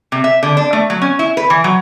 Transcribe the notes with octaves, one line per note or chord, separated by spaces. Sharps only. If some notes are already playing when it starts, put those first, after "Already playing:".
C3
E5
D3
D4
A3
F#3
C#4
E4
B4
E3
F#3